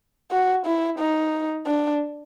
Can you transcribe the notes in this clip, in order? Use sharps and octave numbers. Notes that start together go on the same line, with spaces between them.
F#4
E4
D#4
D4